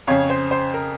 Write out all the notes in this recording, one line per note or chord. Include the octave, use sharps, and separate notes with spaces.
F2 C#3 C#5 F5
C5
C5
A#4